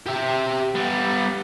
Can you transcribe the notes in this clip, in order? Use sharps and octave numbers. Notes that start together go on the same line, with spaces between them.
G4 E5
G3 B3